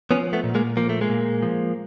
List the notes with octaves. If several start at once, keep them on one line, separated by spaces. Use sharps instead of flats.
F3 B3 C#4
A3 B3
A#2
G#3 A#3
F3 A#3
A3
G#3 A#3
A#2
F3